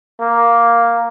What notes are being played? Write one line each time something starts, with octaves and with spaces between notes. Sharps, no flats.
A#3